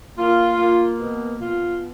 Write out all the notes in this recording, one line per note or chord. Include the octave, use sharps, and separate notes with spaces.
A#3 F4
A#3
B2
B2 F4